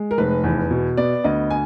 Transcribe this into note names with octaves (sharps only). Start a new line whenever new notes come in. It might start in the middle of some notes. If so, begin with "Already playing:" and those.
Already playing: G#3
A#4
F1 B4
E2
B2
B3 D5
D2 D#5
G#5